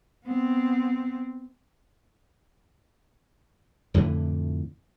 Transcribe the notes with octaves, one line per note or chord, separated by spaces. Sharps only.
B3 C4
F2 A2 D3 E3